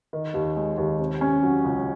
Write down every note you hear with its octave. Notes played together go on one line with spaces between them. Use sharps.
D#3
D#2
G#3
D#2
C3
C#4
F#3
C#2